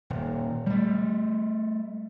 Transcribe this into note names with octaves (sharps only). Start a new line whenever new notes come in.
D#1
G3 A3